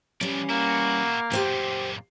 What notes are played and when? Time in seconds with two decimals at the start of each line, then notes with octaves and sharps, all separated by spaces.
0.21 E3 F3 G3 C#4 D5
0.50 A#3 E4 F#4
1.32 D#2 E3 G4 C5 G5
1.44 F#2 A#2